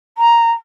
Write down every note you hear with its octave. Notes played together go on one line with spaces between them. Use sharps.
A#5